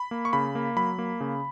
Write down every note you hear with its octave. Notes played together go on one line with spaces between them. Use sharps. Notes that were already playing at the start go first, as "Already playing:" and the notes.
Already playing: B5
A#3
C#6
C#3 B5
A#3
F#3 B5
A#3
C#3